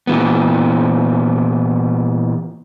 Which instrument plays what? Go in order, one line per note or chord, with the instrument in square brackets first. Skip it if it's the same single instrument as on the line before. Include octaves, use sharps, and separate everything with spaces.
[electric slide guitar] A#2 E3 B3